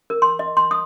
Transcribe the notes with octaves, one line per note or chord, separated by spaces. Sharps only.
A#4
C6
D#5
C6
D#6